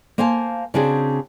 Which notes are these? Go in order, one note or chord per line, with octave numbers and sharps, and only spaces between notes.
A#3 C5 F5 G#5 A5
C#3 C4 D4 F#4 G#4